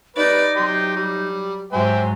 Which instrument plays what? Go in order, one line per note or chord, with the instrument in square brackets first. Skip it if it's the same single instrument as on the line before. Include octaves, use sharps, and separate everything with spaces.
[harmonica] G3 B4 [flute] D#4 [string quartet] D5
[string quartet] F#3 [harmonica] G4 C6
[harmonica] G3
[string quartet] G#2 F#3 [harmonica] C5 E5 G5 [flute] G#5